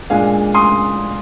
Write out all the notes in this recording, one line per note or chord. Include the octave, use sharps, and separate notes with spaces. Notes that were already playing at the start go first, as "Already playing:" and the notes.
A#2 G#3 D4 F5 G#5
C6 D#6